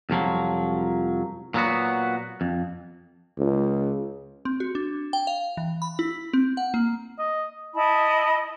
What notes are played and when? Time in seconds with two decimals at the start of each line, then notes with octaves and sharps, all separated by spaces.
0.10 C2 F2 F3 F#3
1.54 A#2 F#3 B3 F#4
2.41 F2
3.38 C#2
4.45 C4
4.60 F#4
4.75 D4
5.13 G5
5.27 F5
5.57 E3
5.82 B5
5.99 E4
6.33 C4
6.57 F#5
6.74 A#3
7.19 D#5
7.75 E4 D#5 A5 B5